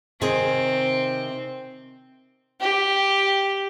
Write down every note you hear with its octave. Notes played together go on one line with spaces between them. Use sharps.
C3 D#3 C4 G#4
G4